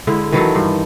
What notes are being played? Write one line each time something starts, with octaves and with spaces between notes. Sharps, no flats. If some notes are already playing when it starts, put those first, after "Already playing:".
D3 G#3 E4
D#3 E3 F#3 A4
G2 C5